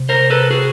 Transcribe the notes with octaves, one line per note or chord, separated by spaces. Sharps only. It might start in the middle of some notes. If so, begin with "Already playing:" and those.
Already playing: C3
A#4 C5
A4 B4
F#4 G#4